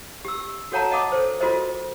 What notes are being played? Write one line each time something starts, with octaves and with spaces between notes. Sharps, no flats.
G4 E6
F#4 A4 C#5 F#5 A5 A#5
D#5 F#5 A5 D6 D#6
A4 C5
F4 F#4 A4 A#4 C5 D#5